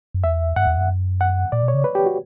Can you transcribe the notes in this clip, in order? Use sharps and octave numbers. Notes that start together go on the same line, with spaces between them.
F#2
E2 E5
G2 F#5
E2
F#2
F#5
A#2 D5
B2
C#5
C#3
B4
G4
F#4